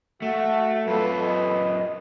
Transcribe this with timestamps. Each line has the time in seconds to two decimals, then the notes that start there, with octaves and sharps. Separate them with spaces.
0.22 A3 F#4 E5
0.87 F#2 F4 A4 B4
1.21 D#5